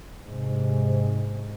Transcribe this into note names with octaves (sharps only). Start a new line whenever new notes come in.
G#2 C3